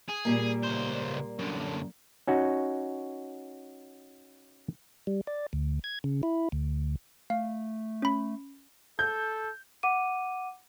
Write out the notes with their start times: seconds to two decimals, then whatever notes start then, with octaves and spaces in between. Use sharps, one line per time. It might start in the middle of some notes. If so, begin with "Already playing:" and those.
0.08 G#4
0.25 A#2 G3 A#3
0.63 C#2 C5
1.39 F#2 D3
2.27 C#4 D#4 F#4
5.07 G3
5.27 D5
5.53 D2
5.84 G#6
6.04 C#3
6.23 E4
6.52 D2
7.30 A3 F5
8.02 C#4 B5
8.99 A4 G6
9.83 F#5 D6 D#7